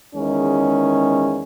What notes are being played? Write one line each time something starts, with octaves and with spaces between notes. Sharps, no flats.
E2 D#3 G#3 C#4